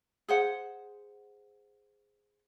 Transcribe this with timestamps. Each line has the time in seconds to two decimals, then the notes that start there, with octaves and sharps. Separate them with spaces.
0.28 G#4 C5 F#5